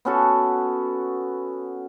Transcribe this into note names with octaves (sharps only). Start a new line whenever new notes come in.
B3 C#4 F#4 A4